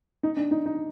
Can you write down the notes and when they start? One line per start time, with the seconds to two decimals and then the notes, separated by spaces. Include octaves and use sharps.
0.23 D#4
0.37 D4
0.51 D#4
0.66 D#4